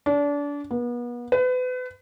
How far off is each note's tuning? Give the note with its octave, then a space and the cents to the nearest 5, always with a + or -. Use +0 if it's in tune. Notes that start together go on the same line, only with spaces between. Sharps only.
D4 -30
B3 -35
B4 +35